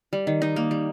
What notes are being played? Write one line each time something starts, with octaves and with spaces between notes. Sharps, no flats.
G3
D#3
D#4
A#3
G3